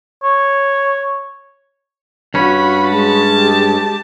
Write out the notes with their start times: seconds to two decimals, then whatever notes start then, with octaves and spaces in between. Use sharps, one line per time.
0.23 C#5
2.34 G2 C#4 F#4 B5
2.90 G#3 A5
3.37 G4